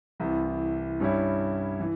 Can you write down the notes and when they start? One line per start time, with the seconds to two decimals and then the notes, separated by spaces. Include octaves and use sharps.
0.20 C2 C3 E3
1.00 G2 G3 C#4 E4
1.80 E3